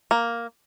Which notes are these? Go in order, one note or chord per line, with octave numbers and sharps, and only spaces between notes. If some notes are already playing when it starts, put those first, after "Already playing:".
A#3